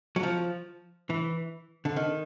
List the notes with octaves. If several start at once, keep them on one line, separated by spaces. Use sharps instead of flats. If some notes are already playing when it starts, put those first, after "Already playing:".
F#3
F3
E3
D3
D#3